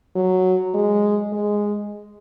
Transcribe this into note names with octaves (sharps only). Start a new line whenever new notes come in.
F#3
G#3
G#3